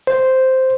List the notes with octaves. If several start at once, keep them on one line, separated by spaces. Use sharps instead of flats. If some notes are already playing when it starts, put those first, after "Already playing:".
C5